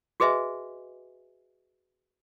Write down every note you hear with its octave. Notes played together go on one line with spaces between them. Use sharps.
F#4 G#4 B4 D#5 E5 G#5